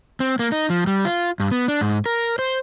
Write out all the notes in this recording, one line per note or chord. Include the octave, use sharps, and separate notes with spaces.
C4
A#3
D#4
F3
G3
F4
G2
B3
D4
G#2
A#4
C5